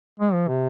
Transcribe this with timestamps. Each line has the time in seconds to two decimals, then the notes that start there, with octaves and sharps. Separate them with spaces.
0.19 G#3
0.34 F3
0.48 C3